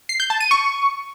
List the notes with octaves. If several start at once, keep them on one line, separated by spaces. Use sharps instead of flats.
C7
G6
A5
D#7
C#6